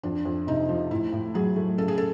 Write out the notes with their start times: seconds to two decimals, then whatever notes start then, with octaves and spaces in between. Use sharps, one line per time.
0.03 F2 D4
0.25 F2
0.47 C3 D#4
0.69 F3
0.91 A2 E4
1.13 A2
1.34 F#3 G#4
1.56 A3
1.78 C#3 A4
1.88 G#4
1.98 A4